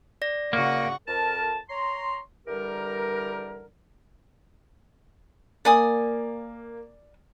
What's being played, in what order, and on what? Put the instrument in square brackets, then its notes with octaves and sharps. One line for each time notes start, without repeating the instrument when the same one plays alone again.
[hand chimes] D5 A#6
[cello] C#3 F#4 [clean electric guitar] A#3 [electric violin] F#5 C#6
[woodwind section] F2 A#4 A5
C#5 A#5 C6
D3 E3 G3 G4 A#4
[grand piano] A#3 [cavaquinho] D5 G#5 D#6